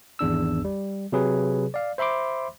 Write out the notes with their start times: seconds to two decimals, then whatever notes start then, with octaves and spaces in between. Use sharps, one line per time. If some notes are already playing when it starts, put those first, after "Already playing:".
0.19 G#1 E2 D4 E6
0.65 G3
1.12 C3 F#3 G#4 B4
1.74 D5 F5
1.98 C5 E5 B5 C6 D6